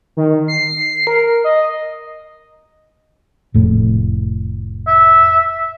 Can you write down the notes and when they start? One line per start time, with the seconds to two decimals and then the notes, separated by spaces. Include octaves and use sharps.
0.17 D#3
0.48 C7
1.07 A#4
1.44 D#5
3.54 F1 A2
4.87 E5